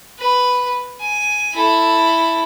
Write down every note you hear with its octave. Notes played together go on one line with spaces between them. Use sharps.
B4
G#5
E4 A4